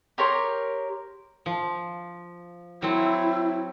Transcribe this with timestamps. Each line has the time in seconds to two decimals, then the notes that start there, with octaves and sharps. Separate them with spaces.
0.18 G4 A#4 C#5 C6
1.46 F3
2.82 F#3 C4 E4